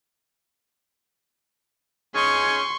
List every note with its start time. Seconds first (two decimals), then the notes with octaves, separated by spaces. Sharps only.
2.14 C#4 D#4 G#4 C6 C#6